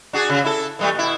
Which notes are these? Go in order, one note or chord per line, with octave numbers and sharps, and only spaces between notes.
D4 F#4 G#4
C#3
E4 A4
E3 G3 A3
B2 E4